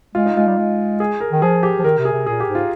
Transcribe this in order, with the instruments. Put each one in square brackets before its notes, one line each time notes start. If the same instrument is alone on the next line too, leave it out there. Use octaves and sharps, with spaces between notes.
[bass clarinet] G#3 [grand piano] F4
[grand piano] D#4
[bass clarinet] G#3 [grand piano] F4
[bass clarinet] G3
G#3
[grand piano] G#4
A#4
[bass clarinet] D#3
[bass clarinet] F3 [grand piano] G#4
[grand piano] G4
[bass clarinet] F3
[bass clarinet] D#3 [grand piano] A#4
[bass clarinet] C3
[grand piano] G#4
[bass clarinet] C3
[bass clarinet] A#2 [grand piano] G#4
[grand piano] G4
[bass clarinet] G#2
[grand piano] F4